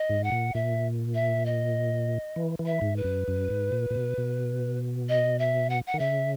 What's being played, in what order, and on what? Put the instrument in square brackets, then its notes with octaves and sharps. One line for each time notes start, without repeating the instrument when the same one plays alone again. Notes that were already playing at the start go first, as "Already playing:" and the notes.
Already playing: [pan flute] D#5
[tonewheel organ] G#2
[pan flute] F#5
[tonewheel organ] A#2
[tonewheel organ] A#2 [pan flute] E5
[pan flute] E5
D#5
[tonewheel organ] E3
E3
[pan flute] E5
[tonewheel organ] G#2
[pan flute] B4
[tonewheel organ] F#2
F#2
G#2
A#2
A#2
B2
B2
[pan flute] D#5
E5
F#5
F#5
[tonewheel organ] D#3
[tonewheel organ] C#3 [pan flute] E5